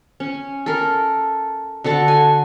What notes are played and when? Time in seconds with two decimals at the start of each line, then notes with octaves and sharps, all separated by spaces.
0.20 C#4
0.66 A4 A#4
1.84 D3 F#4 A4 A5
2.08 G#5